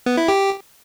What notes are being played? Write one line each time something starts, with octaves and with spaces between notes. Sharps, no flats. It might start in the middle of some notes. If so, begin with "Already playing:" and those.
B3
E4
G4